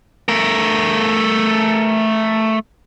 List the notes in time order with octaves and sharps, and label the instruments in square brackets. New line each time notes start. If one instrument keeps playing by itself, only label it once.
[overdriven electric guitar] A3 A#4